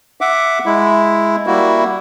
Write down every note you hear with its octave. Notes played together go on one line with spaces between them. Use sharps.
E5 F#5 D6
G#3 E4
G3 A#3 E4 F#4